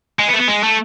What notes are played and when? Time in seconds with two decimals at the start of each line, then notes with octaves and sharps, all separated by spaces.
0.19 G#3
0.28 B3
0.33 A3
0.39 B3
0.48 G#3
0.64 A3